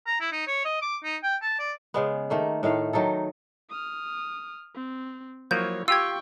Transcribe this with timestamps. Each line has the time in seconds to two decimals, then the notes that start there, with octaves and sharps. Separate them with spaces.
0.07 A#5
0.21 E4
0.32 D#4
0.47 C#5
0.65 D#5
0.82 D6
1.04 D#4
1.23 G5
1.42 A5
1.59 D5
1.94 C#3 G#3 B3
2.30 D#3 A3 A#3
2.63 A2 D#3 A3 F5
2.93 D#3 F#3 D#4 A4
3.70 D#6 F6
4.74 C4
5.51 F3 F#3 A#3 E4 C#5 G6
5.88 F4 G4 G5 C#6 E6 G#6